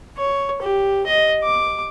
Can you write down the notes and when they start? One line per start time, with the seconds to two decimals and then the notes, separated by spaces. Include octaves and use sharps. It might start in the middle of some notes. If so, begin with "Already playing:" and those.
0.17 C#5
0.62 G4
1.07 D#5
1.44 D6